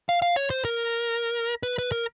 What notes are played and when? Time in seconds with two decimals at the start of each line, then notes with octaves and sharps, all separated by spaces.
0.09 F5
0.22 F5
0.36 C#5
0.50 C5
0.65 A#4
1.63 B4
1.78 B4
1.92 A#4